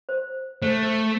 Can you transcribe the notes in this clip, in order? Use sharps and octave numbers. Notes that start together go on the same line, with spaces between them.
C5
A3 C5